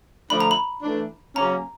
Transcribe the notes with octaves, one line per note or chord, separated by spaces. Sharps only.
D3 F3 A3 D4 B5
A#5
B5
E3 A3 D4
C#3 F#3 A#3 C#4 A#5